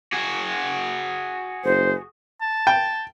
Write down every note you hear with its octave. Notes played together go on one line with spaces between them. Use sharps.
F#4 G#4
F#1 C5
A5
G5